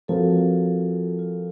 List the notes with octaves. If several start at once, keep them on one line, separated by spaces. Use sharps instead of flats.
F3 C4 F4 F#4 A4 A#4
F4